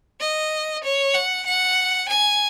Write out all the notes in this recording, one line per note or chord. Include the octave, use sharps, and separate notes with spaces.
D#5
C#5
F#5
F#5
G#5